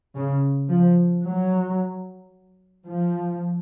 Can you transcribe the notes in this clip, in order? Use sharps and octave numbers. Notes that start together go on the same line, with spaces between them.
C#3
F3
F#3
F3